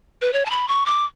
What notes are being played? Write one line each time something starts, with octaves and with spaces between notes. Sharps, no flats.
B4
C#5
A5
B5
C#6
D6